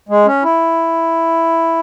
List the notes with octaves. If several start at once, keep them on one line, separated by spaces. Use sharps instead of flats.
G#3
C#4
E4